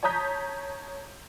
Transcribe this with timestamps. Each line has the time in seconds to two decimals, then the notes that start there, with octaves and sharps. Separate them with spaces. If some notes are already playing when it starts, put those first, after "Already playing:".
0.03 C#5 A5 A#5 D#6 G6 B6